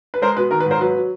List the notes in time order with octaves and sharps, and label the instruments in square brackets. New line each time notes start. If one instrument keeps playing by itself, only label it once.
[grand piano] B4
G#3 A#4 C5
B2 B4
D#3 A#4
B4
G#2 A#4 C5
F#3 B4
F#3